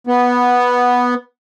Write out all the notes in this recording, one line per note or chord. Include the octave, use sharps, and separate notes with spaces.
B3